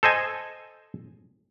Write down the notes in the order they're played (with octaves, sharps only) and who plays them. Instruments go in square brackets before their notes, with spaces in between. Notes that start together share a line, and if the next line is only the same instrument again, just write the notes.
[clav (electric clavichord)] A4 C5 D#5 G#5